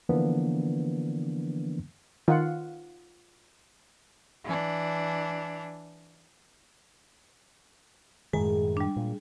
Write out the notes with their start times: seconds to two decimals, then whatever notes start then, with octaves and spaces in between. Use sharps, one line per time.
0.09 D3 E3 F3 A#3 B3 D4
2.28 D#3 F4 F#5
4.44 E3 D4
8.33 F#2 A2 D#3 G#3 G#4
8.77 G3 D4
8.96 A#2